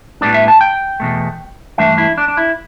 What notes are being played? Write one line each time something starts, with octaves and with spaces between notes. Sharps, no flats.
A2 G3 B3 D4 D5
E5
A5
G5
E2 B2 A3
G2 E3 A3 D4 E5
E4
D4
D4
E4